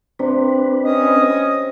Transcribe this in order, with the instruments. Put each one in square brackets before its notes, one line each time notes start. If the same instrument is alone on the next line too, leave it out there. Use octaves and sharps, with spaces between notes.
[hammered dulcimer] C3 [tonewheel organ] C4 D4 B4
[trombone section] C#4 [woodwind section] D#5 D#6